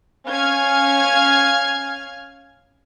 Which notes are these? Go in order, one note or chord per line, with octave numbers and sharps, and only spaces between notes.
C#4 F5 G#5 F6 G#6